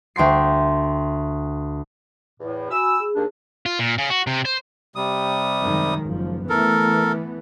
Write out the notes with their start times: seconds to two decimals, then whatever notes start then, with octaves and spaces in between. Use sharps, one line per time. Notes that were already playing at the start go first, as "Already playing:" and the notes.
0.16 D2 G5 C6 C7
2.40 E2 A2
2.70 F#4 G#5 B5 E6
3.00 G#4
3.15 D#2 D4
3.66 F4
3.79 A#2
3.98 C#3
4.10 F#4
4.27 C3
4.45 C5
4.96 C3 G3 D#6
5.62 F#2 D#3 G#3
6.05 F#1 F3
6.49 E3 A3 B3 A4 A#4